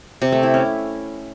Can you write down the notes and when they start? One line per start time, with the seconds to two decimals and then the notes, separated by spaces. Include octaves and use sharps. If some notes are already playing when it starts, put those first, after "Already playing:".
0.22 C3
0.32 A3
0.43 E4
0.54 C#4